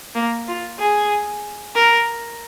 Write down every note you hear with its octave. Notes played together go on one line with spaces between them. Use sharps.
A#3
F4
G#4
A#4